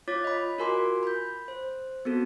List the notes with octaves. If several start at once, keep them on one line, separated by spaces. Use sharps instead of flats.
F4 C#5 D6 A6
D#5 B5
F4 F#4 A#4 G#5 C6 D6
B5 G6
C5
B3 C4 F#4 A4